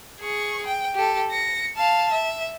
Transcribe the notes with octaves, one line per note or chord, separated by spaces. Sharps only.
G#4 C#6
G5
G4 A4
A#6 C#7
F5 A5
E5